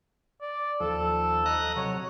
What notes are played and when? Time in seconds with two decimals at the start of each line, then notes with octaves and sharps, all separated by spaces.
0.41 D5
0.80 D#2 F3 A4
1.46 D#5 A#5 F#6
1.76 C3 F#3 C#5